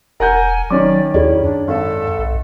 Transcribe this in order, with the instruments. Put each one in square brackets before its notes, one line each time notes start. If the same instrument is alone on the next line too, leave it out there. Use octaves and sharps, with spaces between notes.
[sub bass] E1 [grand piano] A#4 F#5 G6 [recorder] G#5
[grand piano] D#3 C#4 D6 [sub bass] F#3 [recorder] D5
[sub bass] D#2 [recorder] E4 [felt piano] G#4 C#5 D5
[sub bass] F#2 [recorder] D4
[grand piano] G#1 [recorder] A4
[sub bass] B1